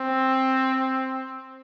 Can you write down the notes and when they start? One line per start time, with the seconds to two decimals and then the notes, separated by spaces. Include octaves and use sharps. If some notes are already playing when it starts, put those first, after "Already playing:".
Already playing: C4